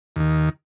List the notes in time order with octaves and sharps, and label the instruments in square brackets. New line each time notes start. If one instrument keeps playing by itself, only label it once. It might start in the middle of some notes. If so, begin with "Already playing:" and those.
[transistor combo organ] D#2 D#3